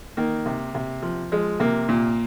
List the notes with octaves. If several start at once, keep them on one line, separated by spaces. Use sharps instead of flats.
D#3 A#3
C3
C3
F3
F3 G#3
C3 A#3
A#2